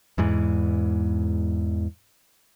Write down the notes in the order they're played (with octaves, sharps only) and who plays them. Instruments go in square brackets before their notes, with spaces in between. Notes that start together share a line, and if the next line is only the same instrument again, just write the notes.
[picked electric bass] E2 G#2 E3